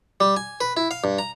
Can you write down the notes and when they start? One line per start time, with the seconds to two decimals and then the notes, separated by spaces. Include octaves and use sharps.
0.20 G3
0.36 G#5
0.61 B4
0.77 E4
0.91 F5
1.04 G2
1.19 A#5